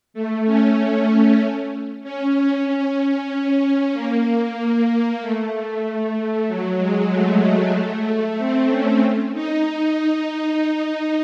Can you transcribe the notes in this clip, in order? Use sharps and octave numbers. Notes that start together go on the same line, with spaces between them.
A3
C#4
C#4
A#3
A3
A3
F#3
G#3
A3
A3
C4
C#4
D#4
D#4